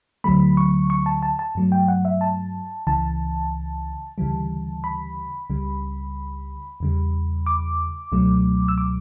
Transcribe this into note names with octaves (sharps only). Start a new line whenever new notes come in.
D2 D3 F#3 A3 B5
C#6
C#6
A5
A5
A5
G2 F#3 A3
G5
F#5
E5
A5
C#2 C#3 E3 A5
D2 C#3 E3 G3
B5
C#2 C#3 G3
E2 C#3 G3
D6
C#2 B2 F#3 A3
E6
D6